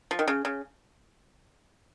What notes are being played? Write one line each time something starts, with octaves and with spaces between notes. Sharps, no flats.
F3
D#3
C#3
C#3